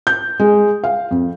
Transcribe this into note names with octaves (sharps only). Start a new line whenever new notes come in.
G6
G#3
F5
F2